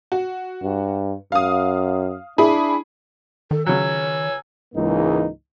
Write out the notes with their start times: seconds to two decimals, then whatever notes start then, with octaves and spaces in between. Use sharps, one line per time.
0.12 F#4
0.63 G2
1.32 F#2 F5 D#6
2.38 D4 E4 G#4 B5
3.51 D#3 A4
3.66 C#3 F#3 C#5 G#5 E6
4.75 C#2 G#2 E3 G#3 A#3 D#4